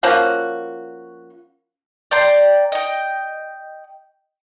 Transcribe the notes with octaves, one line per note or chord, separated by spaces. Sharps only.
F3 A#3 C#4 F#4
D5 G5 A#5 C6
D#5 G5